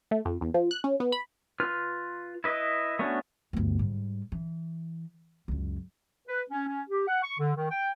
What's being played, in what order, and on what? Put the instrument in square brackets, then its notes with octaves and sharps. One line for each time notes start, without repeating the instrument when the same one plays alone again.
[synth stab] A3
F2
E2
F3
F#6
C#4
B3
B5
[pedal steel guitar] F4 B4 F6
E4 B4 D#5
A3 B3 C#4 D4 F#4
[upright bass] G1 D2
G#2 G3
E3
C#2 F#2
[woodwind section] B4
C#4
C#4
G4
F#5
C#6
D3
D#3
G5